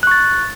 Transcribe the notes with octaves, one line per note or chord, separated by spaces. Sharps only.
C#6 F#6 A6